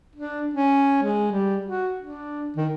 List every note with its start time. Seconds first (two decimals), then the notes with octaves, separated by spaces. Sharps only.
0.15 D4
0.54 C#4
1.02 G#3
1.31 G3
1.66 F#4
2.00 D4
2.56 D#3